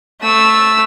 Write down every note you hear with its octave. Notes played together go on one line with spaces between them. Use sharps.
A3 E6